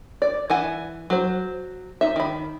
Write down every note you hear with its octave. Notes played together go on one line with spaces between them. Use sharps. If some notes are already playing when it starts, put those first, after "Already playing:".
D5
E3 F#5 G#5
F#3 C5
D#4 E5
D#3 B5